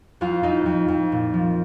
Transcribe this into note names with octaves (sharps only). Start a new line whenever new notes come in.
F2 F4
F2 D#4
F2
F2
A#2
F3